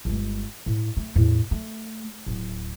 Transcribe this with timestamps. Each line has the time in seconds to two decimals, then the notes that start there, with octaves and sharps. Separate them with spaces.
0.05 G1 G#3
0.66 A2
0.97 A3
1.16 E2 A2
1.51 A3
2.26 D1